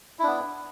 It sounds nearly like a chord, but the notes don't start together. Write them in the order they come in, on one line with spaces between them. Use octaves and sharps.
E4 D4 B3